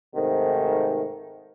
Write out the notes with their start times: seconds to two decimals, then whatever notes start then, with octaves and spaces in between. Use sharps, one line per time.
0.15 G#2 C3 D#3 A3